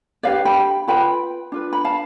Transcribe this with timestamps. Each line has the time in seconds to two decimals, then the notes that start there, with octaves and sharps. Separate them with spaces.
0.23 D4 G4 B4 D5 F5
0.45 G5 B5
0.88 F4 B4 G5 B5
1.52 D4 F4 B4
1.73 B5
1.85 F5 A5